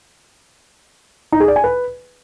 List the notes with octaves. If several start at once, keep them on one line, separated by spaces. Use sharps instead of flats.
D#4
G#4
D5
G#5
B4